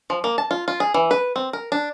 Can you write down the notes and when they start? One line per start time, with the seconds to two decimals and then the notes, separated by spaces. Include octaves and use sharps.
0.10 F3
0.24 A#3
0.38 A5
0.51 F4
0.68 F4
0.80 G#4
0.94 E3
1.11 B4
1.36 C4
1.53 A#4
1.72 D4